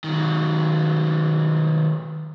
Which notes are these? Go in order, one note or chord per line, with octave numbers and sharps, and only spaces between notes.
D#3 F#3